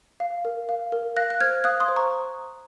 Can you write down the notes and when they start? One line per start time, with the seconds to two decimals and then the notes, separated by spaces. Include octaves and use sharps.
0.20 F5
0.45 A#4
0.69 F5
0.92 A#4
1.16 F5 F#6 A#6
1.30 F#6
1.41 C5 F6 G#6
1.64 F5 D#6 F#6
1.80 C6 D#6
1.88 C5
1.96 A#5 C#6